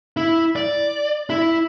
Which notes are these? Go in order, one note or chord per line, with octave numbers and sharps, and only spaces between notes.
E4
D5
E4